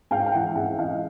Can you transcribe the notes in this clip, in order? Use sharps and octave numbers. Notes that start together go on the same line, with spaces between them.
G#2 F5 G5
G5
E3 E5 F#5
G#2 E5 F#5
E3 D#5 F5